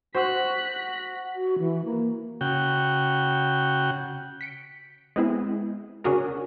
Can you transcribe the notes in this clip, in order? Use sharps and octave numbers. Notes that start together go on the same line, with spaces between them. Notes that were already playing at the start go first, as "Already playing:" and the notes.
F#4 C5 F#6 B6
F#4
E3
A#3
C#3 F#4 G5
B6 C#7 D7
G#3 B3 C4 E4 G#4
C#3 C#4 D4 F#4 G#4 A#4